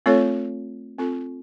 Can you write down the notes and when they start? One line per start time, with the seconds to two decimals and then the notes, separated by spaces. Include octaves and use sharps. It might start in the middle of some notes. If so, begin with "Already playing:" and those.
0.06 A3 C4 F4 A4 C#5
0.98 C4 F4 A4